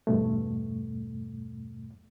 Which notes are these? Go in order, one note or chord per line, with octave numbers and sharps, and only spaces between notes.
E2 G2 B2 A3